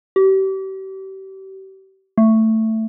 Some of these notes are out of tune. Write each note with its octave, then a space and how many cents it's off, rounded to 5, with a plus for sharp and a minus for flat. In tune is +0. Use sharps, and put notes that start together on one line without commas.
G4 -35
A3 +10